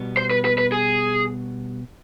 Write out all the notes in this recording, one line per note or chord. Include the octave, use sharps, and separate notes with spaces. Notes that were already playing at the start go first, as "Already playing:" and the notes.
Already playing: B2 G3 B3
C5
B4
B4
B4
G#4